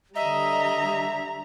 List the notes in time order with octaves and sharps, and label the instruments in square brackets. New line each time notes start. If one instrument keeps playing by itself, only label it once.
[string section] D3 G3 [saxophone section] D#5 [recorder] E5 [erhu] A#5